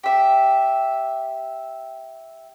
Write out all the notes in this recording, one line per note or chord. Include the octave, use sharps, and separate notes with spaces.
G4 E5